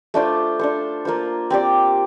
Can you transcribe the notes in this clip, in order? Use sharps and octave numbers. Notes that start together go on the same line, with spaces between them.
A3 D4 F4 C5
D4 A4 C5
A#3 F4 C5
C4 G4 D5